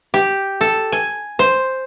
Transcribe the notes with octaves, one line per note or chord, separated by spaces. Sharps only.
G4
A4
G#5
C5